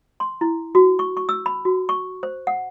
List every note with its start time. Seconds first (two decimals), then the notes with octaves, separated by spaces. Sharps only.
0.20 C6
0.41 E4
0.75 F#4
0.99 C#6
1.17 C#6
1.29 E6
1.46 B5
1.65 F#4
1.89 C#6
2.23 C5
2.47 F#5